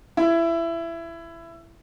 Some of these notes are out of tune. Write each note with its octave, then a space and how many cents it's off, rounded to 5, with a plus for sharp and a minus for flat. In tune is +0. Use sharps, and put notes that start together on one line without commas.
E4 +20